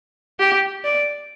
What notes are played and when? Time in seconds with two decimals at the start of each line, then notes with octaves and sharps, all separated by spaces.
0.39 G4
0.84 D5